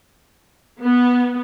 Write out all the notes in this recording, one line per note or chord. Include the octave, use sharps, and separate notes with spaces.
B3